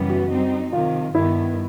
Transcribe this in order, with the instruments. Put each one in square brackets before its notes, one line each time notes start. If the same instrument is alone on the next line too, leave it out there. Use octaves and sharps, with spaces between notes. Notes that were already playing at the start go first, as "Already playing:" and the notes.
Already playing: [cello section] F#2 C#3 E3 G3 B3
[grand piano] F#4
[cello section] G3 C4 D#4
[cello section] C3 D#3 F#3 [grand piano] F4
[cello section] G2 D#3 G3 B3 [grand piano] E4